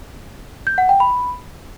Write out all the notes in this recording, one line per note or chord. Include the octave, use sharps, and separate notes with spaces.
G6
F#5
G5
B5